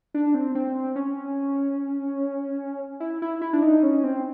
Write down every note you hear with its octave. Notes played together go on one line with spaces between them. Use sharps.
D4
C4
C4
C#4
E4
E4
E4
D4
D#4
C#4
C4